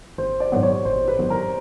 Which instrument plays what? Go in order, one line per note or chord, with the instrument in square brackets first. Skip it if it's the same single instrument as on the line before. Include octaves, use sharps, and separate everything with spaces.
[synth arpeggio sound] G#1 [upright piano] C5
[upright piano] D5
[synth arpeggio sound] G#2 D#3 F#3 B3
[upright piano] C#5
[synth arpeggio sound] G#1 [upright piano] C5
[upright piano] B4
[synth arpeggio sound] G#2 D#3 F#3 B3
[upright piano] A#4